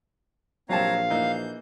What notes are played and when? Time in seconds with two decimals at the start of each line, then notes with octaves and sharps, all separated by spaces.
0.69 A#1 F#3 C4 G4 C#5 F5 A5 A#5
1.10 E3 A#3 D#4 G6